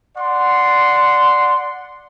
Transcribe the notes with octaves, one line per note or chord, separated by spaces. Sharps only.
D5 F#5 C6